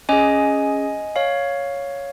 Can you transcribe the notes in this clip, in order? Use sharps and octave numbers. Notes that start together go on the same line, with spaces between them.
C#4 G#4 D#5 G#5
C#5 F5